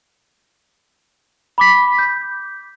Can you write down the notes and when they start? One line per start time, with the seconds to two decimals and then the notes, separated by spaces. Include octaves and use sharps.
1.58 B5 D6 B6
1.98 G6